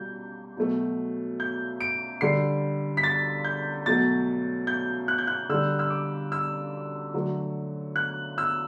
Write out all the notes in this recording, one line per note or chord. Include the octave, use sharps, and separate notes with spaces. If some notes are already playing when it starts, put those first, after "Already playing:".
Already playing: B2 G3 G6
B2 F#3 A3
G6
D7
D3 G3 C7
B6
A6
G6
B2 F#3 A3 A6
G6
F#6
G6
F#6
D3 G3 E6
E6
D6
E6
D3 F#3 A3
F#6
E6